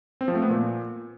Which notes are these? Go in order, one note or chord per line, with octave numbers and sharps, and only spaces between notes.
C4
F3
A3
B3
A#2